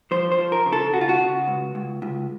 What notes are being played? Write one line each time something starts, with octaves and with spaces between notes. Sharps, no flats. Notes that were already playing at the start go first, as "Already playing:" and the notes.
F3 C5
C5
F3
A#4
C#3
A4
C#3 F#4
F4
F#4
C#3
C#2
C#2
C#2